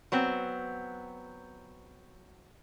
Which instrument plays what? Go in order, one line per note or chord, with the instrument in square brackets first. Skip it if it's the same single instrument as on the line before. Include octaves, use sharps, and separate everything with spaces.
[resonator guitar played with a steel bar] F#3 B3 C4